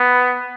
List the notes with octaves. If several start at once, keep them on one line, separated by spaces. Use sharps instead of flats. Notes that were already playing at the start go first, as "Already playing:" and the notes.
Already playing: B3